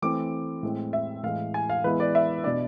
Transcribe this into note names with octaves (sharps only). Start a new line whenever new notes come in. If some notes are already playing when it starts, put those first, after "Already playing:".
E3 A3 C4 D6
A2 G#3 C4
E5
A2 E3 G#3 F5
G#5
F5
E3 G#3 B3 E4 B4
D5
E5
B2 B3 D4 D5